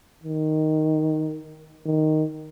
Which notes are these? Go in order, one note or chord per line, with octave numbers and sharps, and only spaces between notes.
D#3
D#3